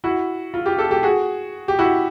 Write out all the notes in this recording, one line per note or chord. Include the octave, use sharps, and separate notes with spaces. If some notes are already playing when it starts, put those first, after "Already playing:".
E4 F#4
F4
F4 G4
G4 A4
G4 A4
F#4 G#4
G4
E4 F#4